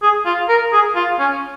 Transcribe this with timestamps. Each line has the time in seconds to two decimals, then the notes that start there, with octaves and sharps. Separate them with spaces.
0.02 G#4
0.26 F4
0.49 A#4
0.73 G#4
0.96 F4
1.19 C#4